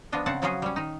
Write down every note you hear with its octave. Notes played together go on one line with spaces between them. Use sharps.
F3 B3 D4 D#5
C#3 C4 F#5 A5
C#3 F3 F#3 C#4 F#4 G#4
G3 C#4
D#3 D#4